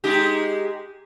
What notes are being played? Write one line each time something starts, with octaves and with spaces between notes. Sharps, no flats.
G#3 D#4 G4